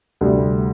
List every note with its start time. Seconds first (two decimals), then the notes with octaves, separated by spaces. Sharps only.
0.21 D2 C3 G3